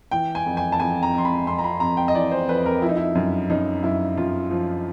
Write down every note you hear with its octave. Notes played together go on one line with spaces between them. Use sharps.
E3 G5
G#5
F2
G#5
A5
F2 G#5
A#5
F2 C6
B5
F2 C6
A#5
B5
F2 A#5
G5
D#5
E3 D5
C5
F2 B4
A#4
F3 E4
D#4
E4
F#2
F#2 D#4
F#2 E4
F#2 F4
F3